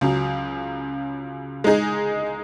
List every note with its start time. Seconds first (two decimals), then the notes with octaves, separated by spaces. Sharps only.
0.01 C#2 C#3 F#3
1.64 G#3 D#4 G#4